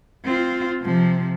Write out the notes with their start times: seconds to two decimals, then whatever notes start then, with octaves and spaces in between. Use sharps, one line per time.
0.25 C4 F4
0.83 C3 F3